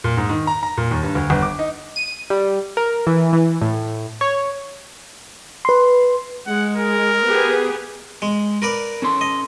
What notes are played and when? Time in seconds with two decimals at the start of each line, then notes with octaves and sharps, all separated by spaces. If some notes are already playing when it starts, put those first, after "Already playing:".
0.04 A#2
0.17 G#2
0.30 D#3
0.47 A#5
0.63 A#5
0.77 A#2
0.91 D#2
1.03 G2
1.15 D2
1.30 G1
1.42 D6
1.59 D#4
1.96 D#7
2.30 G3
2.77 A#4
3.07 E3
3.33 E3
3.62 A2
4.21 C#5
5.65 B4 C6
6.47 G#3 F#5
6.77 A#4
7.25 B3 G4 G#4
8.22 G#3
8.62 A#4 B4 D5
9.02 C#4 A4 C6
9.21 D#5